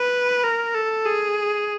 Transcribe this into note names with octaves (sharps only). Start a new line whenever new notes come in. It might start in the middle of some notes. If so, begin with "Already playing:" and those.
Already playing: B4
A#4
A4
G#4